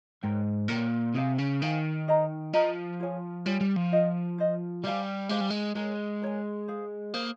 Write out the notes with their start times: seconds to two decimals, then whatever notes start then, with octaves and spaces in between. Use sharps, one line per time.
0.23 G#2 A#4 C#5 G5
0.69 A#2 A#4 C#5 G5
1.15 C3 G#4 C5 F5 G#5
1.39 C#3
1.61 D#3 G#4 C5 F5 G#5
2.08 G#4 C5 D#5 A#5
2.53 F3 G#4 C5 D#5 A#5
3.00 F4 G#4 C#5 G#5
3.45 G3 F4 G#4 C#5 G#5
3.61 G3
3.76 F3
3.92 F4 C5 D#5
4.38 F4 C5 D#5
4.84 G3 G4 C5 F5 G#5
5.29 G#3 G4 C5 F5 G#5
5.41 G3
5.50 G#3
5.76 G#3 A#4 C#5 G#5
6.22 A#4 C#5 G#5
6.68 G#4 C5 F5
7.14 A#3 G#4 C5 F5